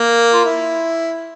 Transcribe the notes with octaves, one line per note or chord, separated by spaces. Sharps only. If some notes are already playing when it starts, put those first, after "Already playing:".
Already playing: A#3
F4
E4